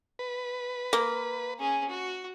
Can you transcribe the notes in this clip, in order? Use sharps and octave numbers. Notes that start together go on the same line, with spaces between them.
B4
A#3
C#4 G#4
F#4